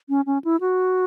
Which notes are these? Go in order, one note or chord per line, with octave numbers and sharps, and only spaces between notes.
C#4
C#4
E4
F#4